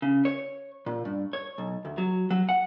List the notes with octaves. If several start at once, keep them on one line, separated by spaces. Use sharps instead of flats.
C#3
C#5
A#2
G2
C#5
B1
D2
F#3
F#3
F#5